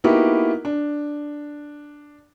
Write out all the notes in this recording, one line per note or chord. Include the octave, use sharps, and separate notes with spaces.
A#3 B3 D#4 E4 F#4 G4
D4